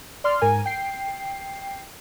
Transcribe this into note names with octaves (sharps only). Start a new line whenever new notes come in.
D5 C6 F6
G#2 A#4 G#5
G5 C7